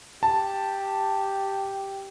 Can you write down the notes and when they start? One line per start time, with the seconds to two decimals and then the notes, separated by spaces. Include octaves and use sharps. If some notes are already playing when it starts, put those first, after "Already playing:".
0.23 G4 A5